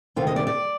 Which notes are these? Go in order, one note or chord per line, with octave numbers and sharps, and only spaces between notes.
D2 C3 D#3 F4
D#5
D5
D5